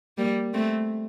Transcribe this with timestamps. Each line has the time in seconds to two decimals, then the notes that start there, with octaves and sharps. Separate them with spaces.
0.18 G3 A#3
0.54 A3 C4